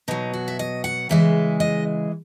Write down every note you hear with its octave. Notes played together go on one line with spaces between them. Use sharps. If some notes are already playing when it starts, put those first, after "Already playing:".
B2 F#3 D#4
F#4
E5
D#5
F#5
C#3 E3 G#3 E5
D#5